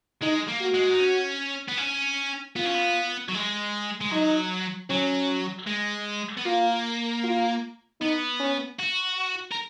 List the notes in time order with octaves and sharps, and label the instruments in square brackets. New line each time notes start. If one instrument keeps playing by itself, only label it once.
[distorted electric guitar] G#3 [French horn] D#4
[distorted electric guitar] A#3
[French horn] F#4
[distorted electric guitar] G#3
D#4
C#4
B3
C#4
[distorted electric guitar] B3 [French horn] F4
[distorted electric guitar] C#4
B3
F#3
G#3
G#3
[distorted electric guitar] F#3 [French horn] D#4
[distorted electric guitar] F#3 [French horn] C#4
[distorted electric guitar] G#3
B3
[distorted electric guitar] A#3 [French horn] F4
[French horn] F4
[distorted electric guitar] B3 [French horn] D#4
[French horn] C#4
[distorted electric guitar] F#4
A#4